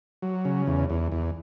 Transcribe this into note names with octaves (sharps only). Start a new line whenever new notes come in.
F#3
C#3
E2
E2
E2